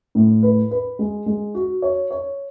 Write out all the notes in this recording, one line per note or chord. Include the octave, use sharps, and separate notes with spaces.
A2
B4
B4
G#3
G#3
F#4
C#5
C#5